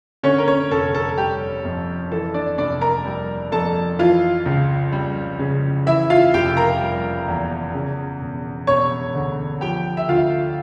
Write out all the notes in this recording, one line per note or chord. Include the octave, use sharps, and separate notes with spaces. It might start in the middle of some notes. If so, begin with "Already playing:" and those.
D3 C#4 C#5
A#4
C#4 C#5
F1 A4
A4
G3 G4
F2
E3 A4
D4 D5
F1 D4 D5
A#4 A#5
G3
F2 A4 A5
E3 F4 F5
C#2
G3
C#3
E3 E4 E5
F4 F5
F1 G4 G5
A#4 A#5
G3
E2
C#3
E1
E1 C#5 C#6
D2
F3 G4 G5
E5
D2 F4 F5